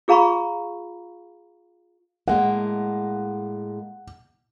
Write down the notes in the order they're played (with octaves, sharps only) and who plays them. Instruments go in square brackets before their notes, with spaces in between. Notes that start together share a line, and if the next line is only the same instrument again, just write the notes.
[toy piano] F4 G#4 F5 A#5 B5 C#6
[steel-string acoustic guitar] A2 G#3 A#3 [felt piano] F#5